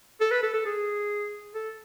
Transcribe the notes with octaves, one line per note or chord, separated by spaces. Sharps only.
A4
B4
A4
A4
G#4
A4